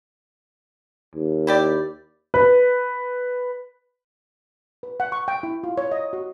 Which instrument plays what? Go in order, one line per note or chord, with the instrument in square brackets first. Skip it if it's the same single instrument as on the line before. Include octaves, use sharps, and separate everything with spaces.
[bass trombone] D#2
[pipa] E4 G4 D5
[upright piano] B4
[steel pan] B4
F#5
C#6
G5
E4
F4
C#5
D#5
F#4